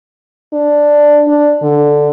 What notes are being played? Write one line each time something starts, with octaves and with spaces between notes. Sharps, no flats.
D4
D4
D3